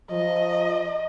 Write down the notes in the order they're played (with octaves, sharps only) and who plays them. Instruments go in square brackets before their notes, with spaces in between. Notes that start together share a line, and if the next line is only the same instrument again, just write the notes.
[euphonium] F3 [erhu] D#5